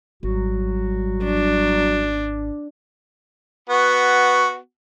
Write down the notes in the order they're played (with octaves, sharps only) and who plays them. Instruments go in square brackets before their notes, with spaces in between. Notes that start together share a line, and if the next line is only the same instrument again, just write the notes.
[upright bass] G#1 [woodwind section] F#3 G3 F#4
[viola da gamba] D4
[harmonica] B3 F#4